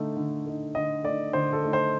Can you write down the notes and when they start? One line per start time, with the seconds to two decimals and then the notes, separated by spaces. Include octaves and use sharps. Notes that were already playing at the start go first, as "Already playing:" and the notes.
Already playing: D3 A3 D#4
0.17 D3
0.46 A3 D#4
0.75 D3 D#5
1.04 A3 D#4 D5
1.33 D3 C5
1.53 A4
1.64 A3 D#4
1.73 C5